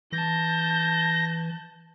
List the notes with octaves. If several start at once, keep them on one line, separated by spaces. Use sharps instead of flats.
E3 A5 G6 A#6